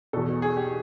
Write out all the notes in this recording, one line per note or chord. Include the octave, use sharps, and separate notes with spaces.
E2 B2 A4
G#4
G4